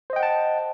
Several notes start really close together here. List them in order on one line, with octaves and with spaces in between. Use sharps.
C5 D#5 G5 F#5 A5